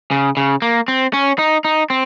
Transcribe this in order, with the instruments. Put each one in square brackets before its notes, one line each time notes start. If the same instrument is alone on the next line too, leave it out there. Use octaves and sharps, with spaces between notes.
[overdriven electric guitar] C#3
C#3
A#3
C4
C#4
D#4
D#4
C4